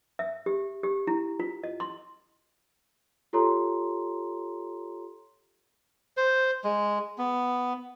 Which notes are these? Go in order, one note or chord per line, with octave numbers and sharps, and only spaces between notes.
E5
G4
G4
E4
F4
D#5
C6
F4 G4 A4 C#5 A#5 C6
C5
G#3
B3